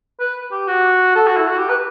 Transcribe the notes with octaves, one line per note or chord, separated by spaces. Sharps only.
B4
G4
F#4
A4
F#4
E4
F#4
G4
B4